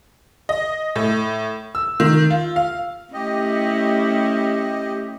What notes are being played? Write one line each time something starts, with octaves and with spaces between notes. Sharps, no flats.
D#5
A2
E6
D#3
F4
F5
A3 C#4 E4 G4 D#5